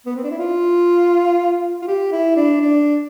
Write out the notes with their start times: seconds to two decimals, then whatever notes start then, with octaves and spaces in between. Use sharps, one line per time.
0.06 B3
0.15 C4
0.24 D4
0.31 E4
0.39 F4
1.82 F4
1.87 G4
2.12 E4
2.37 D4
2.61 D4